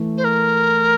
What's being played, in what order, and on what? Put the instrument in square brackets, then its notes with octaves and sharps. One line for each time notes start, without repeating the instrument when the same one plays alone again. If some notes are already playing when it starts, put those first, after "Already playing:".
Already playing: [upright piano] E3 A3
[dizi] C5
A#4